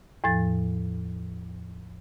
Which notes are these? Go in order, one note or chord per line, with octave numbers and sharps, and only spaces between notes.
E2 A2 F3 A6